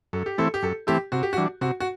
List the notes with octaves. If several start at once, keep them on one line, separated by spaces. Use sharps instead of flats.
F#2 A4
G4
E3 A3 C4 E4 A4
G4
F#2 A4
E3 A3 C4 E4 G4
C3 F#4
G4
F#4
E3 G3 D4
C3 F#4
F#4